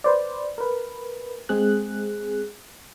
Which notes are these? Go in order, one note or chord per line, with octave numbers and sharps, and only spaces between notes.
B4 C5 D5
A#4 B4
G#3 C4 G#4 F#6